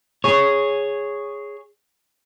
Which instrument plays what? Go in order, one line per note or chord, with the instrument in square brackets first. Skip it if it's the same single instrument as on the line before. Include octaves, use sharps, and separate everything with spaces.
[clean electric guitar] G#4 C#5